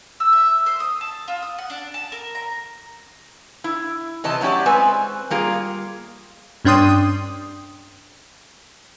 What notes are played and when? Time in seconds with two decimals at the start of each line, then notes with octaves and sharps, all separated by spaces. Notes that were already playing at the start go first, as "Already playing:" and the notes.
0.20 E6
0.33 E5
0.66 C5
0.80 D#6
1.01 A5
1.28 F4
1.42 D#6
1.58 F#5
1.70 D4
1.94 A5
2.12 A#4
2.35 A#5
3.64 E4
4.24 C3 E3 D#5 A5
4.41 F#3 A3 C#4 G4 D5
4.66 G#3 C4 B4 G#5
5.30 G3 A#3 F4 G#4
6.65 G2 C#4 D4 G5 C6 D#6